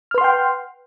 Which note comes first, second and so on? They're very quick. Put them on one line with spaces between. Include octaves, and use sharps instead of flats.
F6 B4 C6 F#5 G5